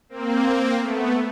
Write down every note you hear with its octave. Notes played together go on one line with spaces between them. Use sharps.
A#3 C4
A3 B3